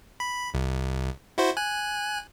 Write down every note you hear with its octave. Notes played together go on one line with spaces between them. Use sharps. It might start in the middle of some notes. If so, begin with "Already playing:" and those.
B5
C2
E4 F#4 C5
G#5 F#6